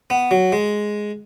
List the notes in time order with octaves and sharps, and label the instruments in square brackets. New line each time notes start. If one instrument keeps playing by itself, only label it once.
[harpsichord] B3
F#3
G#3